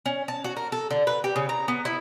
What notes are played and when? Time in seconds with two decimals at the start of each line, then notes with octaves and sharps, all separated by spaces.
0.06 C#4
0.28 A5
0.44 F#4
0.57 A#4
0.72 A4
0.91 D3
1.07 B4
1.24 G4
1.36 C#3
1.49 A#5
1.68 B3
1.85 E4